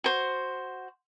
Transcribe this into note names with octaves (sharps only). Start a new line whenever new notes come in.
F#4 C5